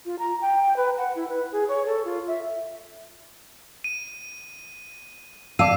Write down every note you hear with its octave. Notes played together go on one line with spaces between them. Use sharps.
F4
A#5
G5
B4
F#5
E4
B4
G#4
C#5
A4
F4
E5
D#7
D5 F5 A5 D6 E6 D#7